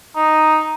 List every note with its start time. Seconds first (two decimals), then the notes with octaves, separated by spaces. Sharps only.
0.16 D#4